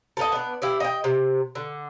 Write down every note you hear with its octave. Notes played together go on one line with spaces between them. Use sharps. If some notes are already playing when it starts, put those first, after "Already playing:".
A4 A#4 D#5
B3 D4
E4 G4 D5
D#5 G5
C3
D3